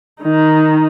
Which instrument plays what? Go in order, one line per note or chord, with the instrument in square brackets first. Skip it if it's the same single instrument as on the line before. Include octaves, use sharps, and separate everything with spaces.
[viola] D#3 D#4